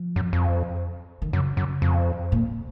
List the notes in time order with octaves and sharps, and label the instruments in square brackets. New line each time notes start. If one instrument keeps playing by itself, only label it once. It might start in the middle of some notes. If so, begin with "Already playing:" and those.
Already playing: [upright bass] F3
[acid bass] F#2
F2
[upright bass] D#3
[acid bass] F#2 [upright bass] C#3
[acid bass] F#2
F2
[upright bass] A#2